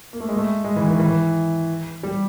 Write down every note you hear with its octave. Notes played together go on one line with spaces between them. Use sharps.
A#3
A3
G#3
A3
G#3
E3
D#3
E3
G3